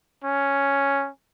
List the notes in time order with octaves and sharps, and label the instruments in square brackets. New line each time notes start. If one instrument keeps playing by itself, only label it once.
[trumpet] C#4